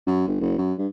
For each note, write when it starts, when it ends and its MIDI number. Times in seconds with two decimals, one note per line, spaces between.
0.07 0.24 42
0.27 0.37 31
0.41 0.56 30
0.58 0.73 42
0.78 0.87 43